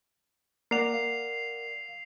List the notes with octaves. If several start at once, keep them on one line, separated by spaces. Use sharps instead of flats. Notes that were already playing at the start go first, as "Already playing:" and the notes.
A#3 A#4 D5 F#5 C7 F7
F5